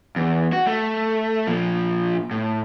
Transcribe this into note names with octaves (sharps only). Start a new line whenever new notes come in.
E2
F#4
A3
A#2 F3
A2